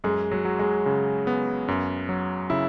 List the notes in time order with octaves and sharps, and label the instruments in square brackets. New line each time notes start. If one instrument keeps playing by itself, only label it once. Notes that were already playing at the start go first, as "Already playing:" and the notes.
[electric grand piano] F#2 [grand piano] G#3
[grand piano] F#3
[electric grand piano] F#3
[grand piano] G#3
[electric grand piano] C#3
B3
F#2
F#3
[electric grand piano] C#3 [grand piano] E4